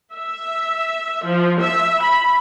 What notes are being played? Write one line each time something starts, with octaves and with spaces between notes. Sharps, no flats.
E5
F3
E5
B5